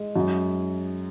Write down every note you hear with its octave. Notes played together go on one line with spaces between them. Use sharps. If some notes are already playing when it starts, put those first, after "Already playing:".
Already playing: G#3
F#2